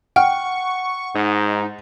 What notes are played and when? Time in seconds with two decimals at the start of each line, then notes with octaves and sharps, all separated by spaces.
0.16 F#5 G5 C#6 F6
1.15 G#2 D#4